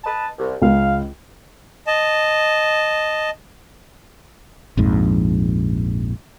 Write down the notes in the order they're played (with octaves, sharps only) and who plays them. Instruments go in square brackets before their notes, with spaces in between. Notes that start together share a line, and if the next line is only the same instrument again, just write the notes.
[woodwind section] B4 D#5 A5
C2
[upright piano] C#2 [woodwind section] F5
[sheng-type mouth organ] D#5 A5
[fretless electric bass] A#1 F2 G#2